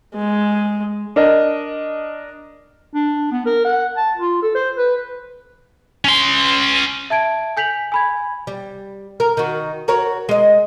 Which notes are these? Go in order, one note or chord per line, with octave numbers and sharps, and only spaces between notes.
G#3
D4 A#4 D#5
D4
B3
A#4
F#5
A5
F4
A4
C5
B4
C#4 C6
E5 A5 G#6 D7
G#5 G6 B6 F7 F#7
G#5 B5 G#6
G3
A#4
D#3 F#4
F#4 A#4 C#5
G#3 D#5